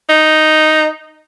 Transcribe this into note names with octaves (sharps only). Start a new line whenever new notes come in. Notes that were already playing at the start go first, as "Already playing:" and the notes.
D#4